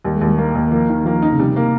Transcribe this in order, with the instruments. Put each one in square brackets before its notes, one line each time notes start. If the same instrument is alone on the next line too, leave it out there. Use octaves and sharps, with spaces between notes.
[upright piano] D#2 [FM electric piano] G3
[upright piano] D#2 [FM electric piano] G#3
[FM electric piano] G3
[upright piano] A#3
D#2
[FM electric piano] F3 [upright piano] A#3
[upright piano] D#3
[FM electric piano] F3 [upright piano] A#3
[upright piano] D#4
[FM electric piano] C#3
[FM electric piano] C3 [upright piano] G3
[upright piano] A#3